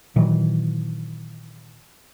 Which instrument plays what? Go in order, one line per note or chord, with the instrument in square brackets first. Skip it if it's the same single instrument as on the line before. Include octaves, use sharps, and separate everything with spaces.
[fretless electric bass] A#2 D#3 E3 F#3